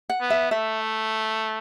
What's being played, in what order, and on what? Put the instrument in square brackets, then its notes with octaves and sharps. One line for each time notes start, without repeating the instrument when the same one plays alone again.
[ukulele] F#5
[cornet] B3
[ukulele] E5
[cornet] A3 [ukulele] E5